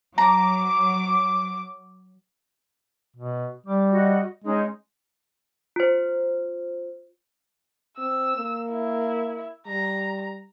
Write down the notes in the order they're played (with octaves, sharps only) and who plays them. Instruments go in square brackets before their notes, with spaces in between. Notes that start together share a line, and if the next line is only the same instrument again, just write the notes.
[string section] F#3 D6 [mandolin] A#5
[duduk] B2
[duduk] G3 [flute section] D6
[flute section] F#4 D#5
[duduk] G#3 [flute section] C#4 D#4 G#4
[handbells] F4 C5
[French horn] C4 [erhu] E6
[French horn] A#3
[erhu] E4
[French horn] G3 [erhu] A#5